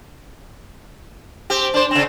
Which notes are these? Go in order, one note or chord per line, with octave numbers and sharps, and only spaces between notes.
C4 G4
D4 C5
C#3 C4